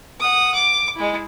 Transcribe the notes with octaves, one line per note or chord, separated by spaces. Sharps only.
F#5 D#6
D6
G#3 E4